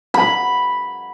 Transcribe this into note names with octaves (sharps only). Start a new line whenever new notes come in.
B5